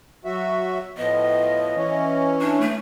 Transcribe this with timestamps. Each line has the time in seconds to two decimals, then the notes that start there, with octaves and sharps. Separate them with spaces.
0.25 F#3 F#4 E5
0.98 A2 F3 B3 D#5
1.75 E3 C#4
2.41 D4
2.61 A3